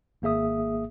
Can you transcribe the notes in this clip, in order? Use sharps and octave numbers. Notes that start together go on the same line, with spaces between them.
G#1 A#3 G#4 E5 D#6